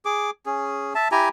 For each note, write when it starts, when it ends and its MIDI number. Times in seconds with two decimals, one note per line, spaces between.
0.05 0.30 68
0.05 0.30 86
0.46 0.93 61
0.46 0.93 68
0.95 1.08 76
0.95 1.08 81
1.12 1.29 64
1.12 1.29 67
1.12 1.29 80
1.12 1.29 82